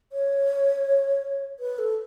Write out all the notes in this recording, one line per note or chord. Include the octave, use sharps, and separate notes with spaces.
C#5
B4
A4